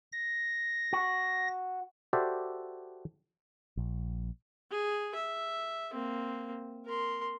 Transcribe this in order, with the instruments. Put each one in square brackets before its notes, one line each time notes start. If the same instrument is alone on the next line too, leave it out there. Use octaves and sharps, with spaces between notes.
[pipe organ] A#6
[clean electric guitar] F#4
[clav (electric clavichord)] F#4 G4 A4 C5 D5 E5
[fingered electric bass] A#1
[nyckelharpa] G#4
E5
A#3 C4
A#4 C6